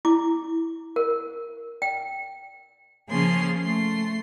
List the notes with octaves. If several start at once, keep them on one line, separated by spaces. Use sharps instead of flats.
E4 D6
A#4
G5
C#3 F3 A#3 C#4 G#4 C6
A3 C6